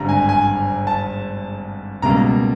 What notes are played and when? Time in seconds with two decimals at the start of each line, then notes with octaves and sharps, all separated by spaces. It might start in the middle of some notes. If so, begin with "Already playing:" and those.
Already playing: G#1 G2 D3 G3 A#5
0.09 G#5
0.29 G#5
0.87 A5
2.02 C#2 B2 G3 A#3 A#5